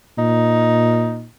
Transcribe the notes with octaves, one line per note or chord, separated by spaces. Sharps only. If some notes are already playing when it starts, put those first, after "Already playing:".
A#2 D#4